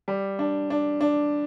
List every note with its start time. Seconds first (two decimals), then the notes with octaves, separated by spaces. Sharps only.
0.08 G3
0.39 D4
0.70 D4
1.01 D4